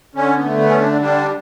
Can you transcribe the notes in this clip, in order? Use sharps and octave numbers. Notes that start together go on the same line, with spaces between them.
D3 C#4
B3
A3
B3
D3 C#4
D4
G3 D4